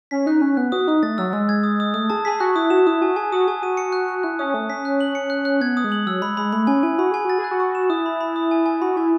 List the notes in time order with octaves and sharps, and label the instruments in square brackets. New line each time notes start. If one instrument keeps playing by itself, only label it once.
[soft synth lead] C#4 [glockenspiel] B6
[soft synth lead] D#4 [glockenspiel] F#6
[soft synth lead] C#4 [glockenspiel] F#6
[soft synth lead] B3 [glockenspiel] F#6
[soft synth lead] F#4 [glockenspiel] D#6
[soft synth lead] D#4 [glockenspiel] D#6
[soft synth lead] A3 [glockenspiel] A6
[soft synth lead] F#3 [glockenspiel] E6
[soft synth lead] F#3
[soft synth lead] G#3 [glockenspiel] E6
[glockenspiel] G#6
D#6
D#6
[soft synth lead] A3 [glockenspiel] D#6
[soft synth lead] G#4 [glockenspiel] A5
[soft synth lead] G#4 [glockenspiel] B6
[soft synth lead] F#4 [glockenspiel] F#6
[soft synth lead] E4 [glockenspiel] D#6
[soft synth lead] F#4 [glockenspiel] E7
[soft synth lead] E4 [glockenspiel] D#6
[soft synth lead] F#4 [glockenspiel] G#5
[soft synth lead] G#4 [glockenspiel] G#5
[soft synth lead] F#4 [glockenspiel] D#6
[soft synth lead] G#4 [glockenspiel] G#5
[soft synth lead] F#4 [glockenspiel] D#7
[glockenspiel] C#7
F#6
F#6
[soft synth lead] E4 [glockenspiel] F#6
[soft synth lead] C#4 [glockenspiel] D#6
[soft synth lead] A3 [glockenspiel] D#6
[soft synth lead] C#4 [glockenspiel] B6
[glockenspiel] F#6
F#7
C#7
F#6
F#6
[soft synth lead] B3 [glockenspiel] G#6
[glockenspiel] D#6
[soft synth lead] G#3
[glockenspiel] F#7
[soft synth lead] F#3 [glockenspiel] E6
[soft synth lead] G#3 [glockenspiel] B5
[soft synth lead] G#3 [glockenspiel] B5
[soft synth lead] A3 [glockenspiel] B5
[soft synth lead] C#4 [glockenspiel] G#5
[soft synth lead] E4 [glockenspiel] G#5
[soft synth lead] F#4 [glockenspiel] B5
[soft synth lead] G#4 [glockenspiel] G#5
[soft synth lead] F#4 [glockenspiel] A6
[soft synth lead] G#4
[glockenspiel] F#6
[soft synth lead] F#4
[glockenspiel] C#6
E7
[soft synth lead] E4 [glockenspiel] D#6
[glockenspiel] B5
B5
D#6
G#5
G#5
[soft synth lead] F#4 [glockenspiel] B5
[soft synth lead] E4 [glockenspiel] G#5